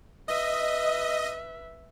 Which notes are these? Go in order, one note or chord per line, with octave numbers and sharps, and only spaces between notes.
B4 D#5 E5